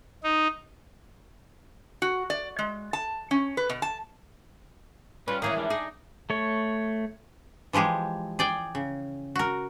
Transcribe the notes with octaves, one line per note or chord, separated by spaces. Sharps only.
D#4
F#4
D5
G#3
A5
C#4
B4
B2
A5
G3 C#4 F4 B4
D#3 E3 A#3 C#4 D#4 G#4
G3 G#3 D4
D#4 G#4
A3 C#5
E3 F3 G#3 G4 G#4
G#4 D5 G5
C#3
F#4 A#4